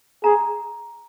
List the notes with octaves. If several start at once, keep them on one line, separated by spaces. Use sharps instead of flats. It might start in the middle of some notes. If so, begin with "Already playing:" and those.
G#4 A#5